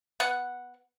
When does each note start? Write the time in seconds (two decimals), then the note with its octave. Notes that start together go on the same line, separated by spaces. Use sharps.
0.20 B3 F#5